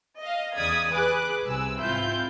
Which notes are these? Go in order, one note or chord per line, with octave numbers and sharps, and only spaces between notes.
D#5 F5
E2 C#3 D5 D#6 G#6 B6
G#4 B4 G#5 D6 F#6
C2 C3 G#5 E6
G#2 C4 E4 F4 G6